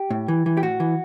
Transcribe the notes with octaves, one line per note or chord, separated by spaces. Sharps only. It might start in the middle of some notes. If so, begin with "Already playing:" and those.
Already playing: G4
A2
E3
E3
G4
A2 F#4
E3